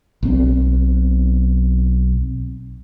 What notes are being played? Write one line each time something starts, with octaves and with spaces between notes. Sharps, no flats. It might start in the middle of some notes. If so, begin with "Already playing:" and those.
B1 C4